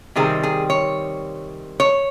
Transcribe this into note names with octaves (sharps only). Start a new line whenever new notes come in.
C3 D#3 G3 C4 G#4
G#4
C#5
C#5